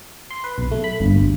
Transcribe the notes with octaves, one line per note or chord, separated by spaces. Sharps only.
C6
B4
B1
A3
B5
G1
D2